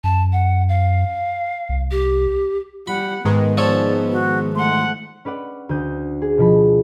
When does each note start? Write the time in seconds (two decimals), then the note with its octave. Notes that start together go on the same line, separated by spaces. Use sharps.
0.04 F#2 A5
0.33 F#5
0.69 F5
1.69 C2
1.91 G4
2.87 G3 F#5 B5
3.25 G#2 D#3 G#3 B3 B4
3.57 F3 A4 C#5 D5
4.12 F#4
4.55 A3 F#5 C6
5.25 C#4 B4 D5 F#5
5.69 D2 D#6 G6
6.22 G#4
6.38 B2 F3 B5